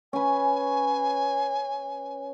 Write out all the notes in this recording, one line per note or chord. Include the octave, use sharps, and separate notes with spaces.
C#4 B4 G#5